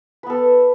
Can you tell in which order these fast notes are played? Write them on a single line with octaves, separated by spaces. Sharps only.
B4 B3 A4